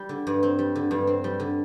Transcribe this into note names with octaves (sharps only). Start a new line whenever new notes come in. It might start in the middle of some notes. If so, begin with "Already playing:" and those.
Already playing: G3
D3
G2
C4
G3
D3
G2
C4
G3
D3